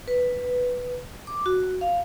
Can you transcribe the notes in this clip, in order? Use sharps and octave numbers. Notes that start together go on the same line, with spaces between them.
B4
D6
F#4
F5